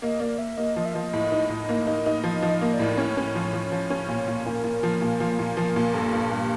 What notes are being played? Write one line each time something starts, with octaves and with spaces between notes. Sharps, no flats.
A#3 D#5
A#3 D5
A#3 E5
A#3 D#5
F3 D#5
E5
F3 D#5
A2
D#4
A2
A#3
D#4
D#4
F3 D#5
F3
D#5
A#3
D5
A2
C#4 C#5
C#4
F3
F3
F3
C#4
A#2
A#2
A#2 A#4
A#2
F3
A#2
F3
A#2
F3
A#2
G2 A4
G2
G2 G4